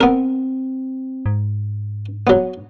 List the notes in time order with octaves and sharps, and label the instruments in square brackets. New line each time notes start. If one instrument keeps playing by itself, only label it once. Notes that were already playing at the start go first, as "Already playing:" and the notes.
[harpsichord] B3 A#4 [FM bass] C4
[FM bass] G#2
[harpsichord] F#3 B3